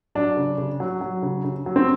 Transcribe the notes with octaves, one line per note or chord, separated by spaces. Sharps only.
F#3 D4
C#3
C#3
F#3
F#3
C#3
C#3
F#3
C4